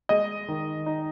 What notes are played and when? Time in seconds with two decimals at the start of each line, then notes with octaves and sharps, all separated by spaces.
0.09 G#3 D#5
0.48 D#3
0.86 D#4